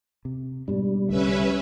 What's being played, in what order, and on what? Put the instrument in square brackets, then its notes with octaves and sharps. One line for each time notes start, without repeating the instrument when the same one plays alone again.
[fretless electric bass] C3
[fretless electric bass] G#2 B2 D4 [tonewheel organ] G3
[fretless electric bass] C2 D3 A3 [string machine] C#4 B4 E5